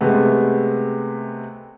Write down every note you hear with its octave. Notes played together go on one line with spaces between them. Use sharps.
C3 G#3 A3 B3